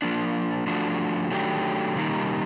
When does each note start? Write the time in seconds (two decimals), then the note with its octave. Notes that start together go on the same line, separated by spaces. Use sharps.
0.02 F3 A#3 D4
0.67 F3 A3 D4 F#4
1.31 D#3 F#3 A3 D4 G4
1.95 C3 D#3 G3 A#3 D#4